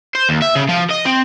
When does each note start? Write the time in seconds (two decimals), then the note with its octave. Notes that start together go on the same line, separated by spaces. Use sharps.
0.15 C5
0.29 D#2
0.42 E5
0.55 C#3
0.69 F3
0.91 D#5
1.06 C4